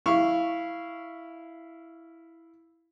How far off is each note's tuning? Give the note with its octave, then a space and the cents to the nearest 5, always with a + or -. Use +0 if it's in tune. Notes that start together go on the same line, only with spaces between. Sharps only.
E4 +0 F5 -15 C#6 +0